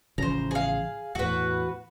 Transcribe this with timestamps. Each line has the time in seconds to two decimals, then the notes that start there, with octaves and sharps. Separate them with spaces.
0.18 A1 C#3 F3 C5 A#5
0.51 G#4 F5
1.15 E2 A2 F#4 B4